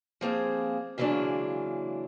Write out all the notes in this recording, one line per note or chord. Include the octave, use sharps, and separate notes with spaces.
F3 G3 A#3 C4 G#4
C#3 E3 F#3 G#3 A#3 D4